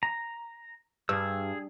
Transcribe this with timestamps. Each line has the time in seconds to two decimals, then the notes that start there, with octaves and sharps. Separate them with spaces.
0.03 A#5
1.09 G2 G#4 E6